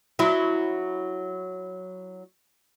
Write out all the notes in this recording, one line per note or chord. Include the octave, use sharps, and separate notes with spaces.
F#3 E4